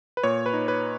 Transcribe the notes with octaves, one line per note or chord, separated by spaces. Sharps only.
B4
A#2 C#5
B4
D#4
B4